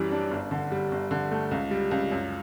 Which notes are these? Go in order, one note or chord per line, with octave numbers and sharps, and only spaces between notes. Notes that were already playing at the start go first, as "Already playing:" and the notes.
Already playing: F#2 E3 G3
D4
G1
D3
G3
G1
D3
A3
C#2
G3
C#2
F#2